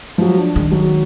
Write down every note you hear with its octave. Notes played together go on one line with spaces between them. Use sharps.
F3 F#3
D4
D#3 G#3
F#3